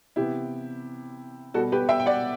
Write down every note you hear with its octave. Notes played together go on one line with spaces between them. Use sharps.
C3 E3 B3 E4 G4
B2 G3 B3 F#4 A4
G4 B4
E5 G5
G5
D5 F#5